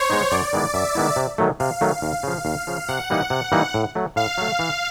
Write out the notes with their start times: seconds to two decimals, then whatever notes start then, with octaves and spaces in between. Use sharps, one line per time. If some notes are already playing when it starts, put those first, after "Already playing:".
Already playing: C5 C#5
0.10 G#3 B3 D#4
0.31 F#2 D5
0.53 D#3 G#3 B3 E4
0.74 F#2 E5
0.95 D#3 G#3 B3 E4
1.16 C3
1.38 D#3 F#3 A3
1.60 C3 F5
1.81 D#3 F#3 A3
2.02 D#2 F5
2.23 C#3 F3
2.45 D#2 F5
2.67 C#3 F3
2.88 C3 F#5
3.10 E3 G3 A#3 D#4
3.30 C3
3.52 E3 G3 A#3 D#4
3.74 A2
3.95 F#3 A3
4.16 A2 F5
4.38 F#3 A3
4.59 E3